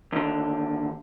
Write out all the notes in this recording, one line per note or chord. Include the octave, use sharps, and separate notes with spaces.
D#2 D3